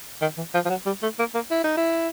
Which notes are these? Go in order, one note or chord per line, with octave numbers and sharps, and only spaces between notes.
D#3
E3
F3
F3
F#3
G3
A3
A#3
A#3
E4
D#4
E4